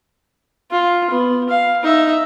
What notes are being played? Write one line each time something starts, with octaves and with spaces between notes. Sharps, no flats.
F4
B3
F5
D#4 E5